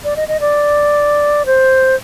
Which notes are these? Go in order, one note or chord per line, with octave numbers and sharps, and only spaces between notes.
D5
D#5
D#5
D5
C5